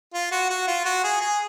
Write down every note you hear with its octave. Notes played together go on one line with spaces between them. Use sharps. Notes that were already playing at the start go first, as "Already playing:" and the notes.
F4
F#4
F#4
F4
F#4
G#4
G#4